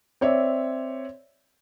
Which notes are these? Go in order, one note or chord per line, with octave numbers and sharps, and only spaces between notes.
C4 C#5 D5 E5